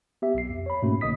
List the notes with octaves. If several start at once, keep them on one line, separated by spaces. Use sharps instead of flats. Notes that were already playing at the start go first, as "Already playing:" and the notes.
B3 G4 E5
B1 C7
F2
C#5 B5
G#2 B2 A3 A#3 C#4 F#4
B1 D3 A#3 D#5 D#6 B6